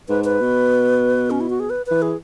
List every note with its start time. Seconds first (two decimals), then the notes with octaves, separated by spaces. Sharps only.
0.09 G#2 B4
0.24 B4
0.41 B2
1.31 C#4
1.40 E4
1.50 F#4
1.60 G#4
1.70 B4
1.86 E3 B4
2.02 G#4